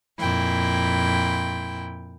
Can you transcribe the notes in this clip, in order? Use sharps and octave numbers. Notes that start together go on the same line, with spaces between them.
F2 A#2 E4 G5